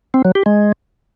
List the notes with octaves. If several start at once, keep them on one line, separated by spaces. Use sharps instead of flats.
C4
F#3
G4
G#3